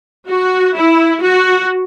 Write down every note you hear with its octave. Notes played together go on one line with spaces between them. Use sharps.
F#4
E4
F#4